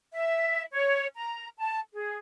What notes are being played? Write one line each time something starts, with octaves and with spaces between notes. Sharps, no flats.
E5
C#5
A#5
A5
G#4